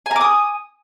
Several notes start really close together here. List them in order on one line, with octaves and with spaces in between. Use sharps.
G#5 A#5 D6 D#6